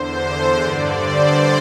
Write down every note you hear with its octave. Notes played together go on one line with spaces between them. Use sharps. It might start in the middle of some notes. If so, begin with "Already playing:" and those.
Already playing: E2 D3 C5
G2 D3 D5
C5